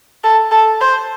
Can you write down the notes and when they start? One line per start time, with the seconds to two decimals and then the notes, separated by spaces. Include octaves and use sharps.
0.24 A4
0.51 A4
0.81 C5